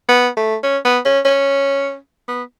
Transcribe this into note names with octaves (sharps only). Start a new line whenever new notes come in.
B3
A3
C#4
B3
C#4
C#4
B3